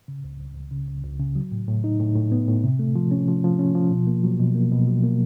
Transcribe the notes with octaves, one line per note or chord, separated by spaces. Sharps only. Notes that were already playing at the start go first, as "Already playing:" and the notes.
C#3
C#2
C#2
C#2
C#3
C#2
C#2
C#3
F#3
A2
A2
D#4
A2
A2
B3
A2
C3
A3
F3
C#4
F3
F3
C#4
F3
B2
A#3
F#3
B2
A#3
B2
F#3
A#3